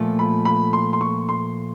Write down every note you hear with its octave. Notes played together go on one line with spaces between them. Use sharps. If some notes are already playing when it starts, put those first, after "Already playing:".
Already playing: A#2 F3 A3
B5
B5
C6
C6
C#6
C6